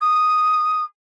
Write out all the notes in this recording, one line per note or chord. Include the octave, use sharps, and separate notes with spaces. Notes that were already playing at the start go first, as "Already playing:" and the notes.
D#6